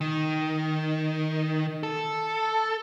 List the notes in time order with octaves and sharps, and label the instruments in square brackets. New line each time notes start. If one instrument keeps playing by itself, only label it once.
[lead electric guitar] D#3
A4